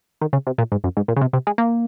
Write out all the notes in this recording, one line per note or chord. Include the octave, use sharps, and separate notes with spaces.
D#3
C#3
C3
A#2
G#2
F#2
G#2
A#2
C#3
C3
C3
G#3
A#3